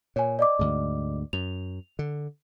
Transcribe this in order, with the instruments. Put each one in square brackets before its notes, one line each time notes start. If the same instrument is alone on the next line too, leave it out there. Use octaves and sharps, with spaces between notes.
[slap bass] A#2 [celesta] C#5 G#5
[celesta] D5 D#5 D6
[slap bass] D2 G#2
[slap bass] F#2 [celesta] F7
[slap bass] D3